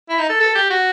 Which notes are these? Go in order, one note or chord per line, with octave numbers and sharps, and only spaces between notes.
E4
D#4
A4
A4
G4
F#4